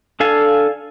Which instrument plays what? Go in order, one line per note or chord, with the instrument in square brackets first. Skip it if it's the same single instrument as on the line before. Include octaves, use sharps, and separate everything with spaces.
[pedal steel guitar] D4 A4 F5 G#5 A5